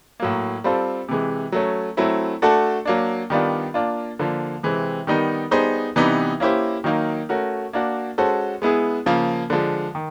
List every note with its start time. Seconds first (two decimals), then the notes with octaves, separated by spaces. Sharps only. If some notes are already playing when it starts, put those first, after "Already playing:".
0.20 A2 F#3 A#3
0.64 G3 C4 F4 A4 C5
1.09 C3 E3 G#3
1.52 F#3 A3 C#4
1.97 F#3 A3 C4 E4
2.42 A3 D4 F#4 A4
2.85 F#3 A#3 D4
3.30 D#3 G3 B3 D4 F4
3.74 A#3 D4 F4
4.19 D3 F3 A#3
4.63 C3 E3 G#3 C4
5.07 D#3 G3 B3 D#4
5.51 G3 B3 D#4 G#4 C5
5.96 C3 E3 G3 B3 D#4
6.40 A#3 C#4 E4 G4 C5
6.84 D#3 F#3 A#3 D#4
7.29 A3 C#4 F#4 A#4
7.73 A#3 D4 F#4
8.18 G#3 C#4 F#4 A4 C5
8.62 G#3 B3 E4 G#4
9.06 C#3 F3 A#3
9.50 D3 F3 G#3
9.95 D#3